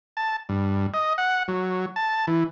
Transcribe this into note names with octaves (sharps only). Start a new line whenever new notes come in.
A5
G2
D#5
F#5
F#3
A5
E3